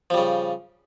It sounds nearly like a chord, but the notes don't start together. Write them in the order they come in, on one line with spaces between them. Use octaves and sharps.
F3 G3 C#3